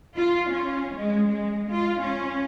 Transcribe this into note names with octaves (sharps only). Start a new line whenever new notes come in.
F4
C#4
G#3
G#3
F4
C#4